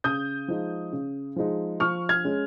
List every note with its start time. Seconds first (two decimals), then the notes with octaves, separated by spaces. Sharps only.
0.04 C#3 D#6 G6
0.48 F3 G#3 D#4
0.92 C#3
1.36 F3 G#3 D#4
1.80 F3 C#6 F6
2.09 F6 G#6
2.24 G#3 C#4